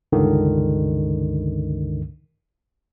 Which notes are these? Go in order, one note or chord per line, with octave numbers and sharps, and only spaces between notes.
C#2 G2 D3 D#3